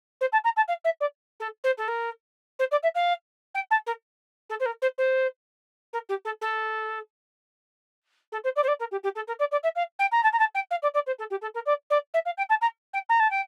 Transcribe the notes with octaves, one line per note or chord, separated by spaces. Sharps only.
C5
A5
A#5
A5
F5
E5
D5
A4
C5
A4
A#4
C5
D5
E5
F5
G5
A5
A#4
A4
C5
A#4
C5
C5
A#4
G4
A4
A4
A4
C5
D5
C5
D5
A#4
G4
G4
A4
A#4
D5
D5
E5
F5
G5
A#5
A5
A#5
A5
G5
F5
D5
D5
C5
A4
G4
A4
A#4
D5
D5
E5
F5
G5
A5
A#5
G5
A#5
A5
G5